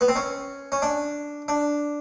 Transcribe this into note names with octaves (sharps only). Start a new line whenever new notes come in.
B3
C4
C#4
C#4
D4
D4